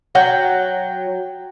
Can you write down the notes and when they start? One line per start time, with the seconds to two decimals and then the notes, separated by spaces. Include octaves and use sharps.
0.15 F#3 F#4 F#5 G5